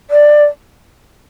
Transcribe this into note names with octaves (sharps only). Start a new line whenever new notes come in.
D5